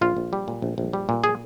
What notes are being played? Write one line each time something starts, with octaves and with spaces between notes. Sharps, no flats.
A#1 F4
A#1
G3
A#2
A#1
A#1
G3
A#2
G#4